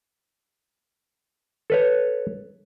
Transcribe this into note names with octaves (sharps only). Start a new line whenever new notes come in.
A4 B4 C#5